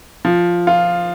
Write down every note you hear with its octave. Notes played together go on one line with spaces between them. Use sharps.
F3
F4